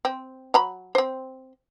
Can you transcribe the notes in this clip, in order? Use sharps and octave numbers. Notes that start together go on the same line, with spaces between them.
C4
F#3 A#5 B5
C4 C5